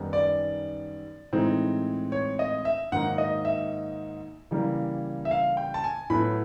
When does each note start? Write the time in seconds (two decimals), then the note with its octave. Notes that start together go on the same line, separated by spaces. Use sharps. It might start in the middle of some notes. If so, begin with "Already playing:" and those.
Already playing: F#2 D#3 G3 B3 D#4
0.13 D5
1.32 A2 E3 G#3 C4 D#4
2.12 C#5
2.39 D#5
2.65 E5
2.92 G#2 D#3 F#3 A#3 D#4 F#5
3.18 D#5
3.45 E5
4.51 C#3 E3 G3 A#3
5.25 E5
5.31 F5
5.57 G5
5.74 A5
5.84 G#5
6.10 A2 F#3 B3 B5